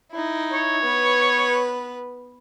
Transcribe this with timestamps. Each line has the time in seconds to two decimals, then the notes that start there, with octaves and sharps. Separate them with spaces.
0.12 D#4 E4
0.53 C#5
0.83 B3 B4